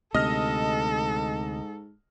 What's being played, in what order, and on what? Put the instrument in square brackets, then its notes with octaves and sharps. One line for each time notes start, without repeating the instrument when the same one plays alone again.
[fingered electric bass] D2 C3 [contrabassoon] G#2 [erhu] A4 [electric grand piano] D#5 F6 A#6